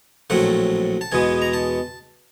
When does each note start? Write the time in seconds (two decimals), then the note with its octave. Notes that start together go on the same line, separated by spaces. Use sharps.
0.30 A#1 A2 F#3 A3 C4 F#5
1.01 A5
1.12 E2 B2 G#3 B3 G#5
1.42 A#5
1.53 A5